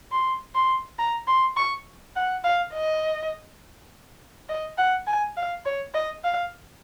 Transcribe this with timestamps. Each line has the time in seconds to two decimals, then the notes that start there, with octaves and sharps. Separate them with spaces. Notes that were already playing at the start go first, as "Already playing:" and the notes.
0.11 C6
0.54 C6
0.99 A#5
1.27 C6
1.57 C#6
2.16 F#5
2.44 F5
2.73 D#5
4.49 D#5
4.78 F#5
5.07 G#5
5.37 F5
5.65 C#5
5.94 D#5
6.24 F5